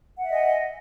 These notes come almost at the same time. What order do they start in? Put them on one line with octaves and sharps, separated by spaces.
F#5 E5 D#5 G#5